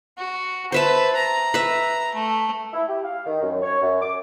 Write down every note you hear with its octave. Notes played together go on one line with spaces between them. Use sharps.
F#4
B4 C5 E5 A5
A#5
B4 E5
A3
E4
G4
F5
D#3
F#2
C#5
F#2
D6